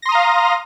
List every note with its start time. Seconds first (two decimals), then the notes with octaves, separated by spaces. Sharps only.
0.02 A#6
0.06 C6
0.09 D#6
0.12 A#5
0.15 F5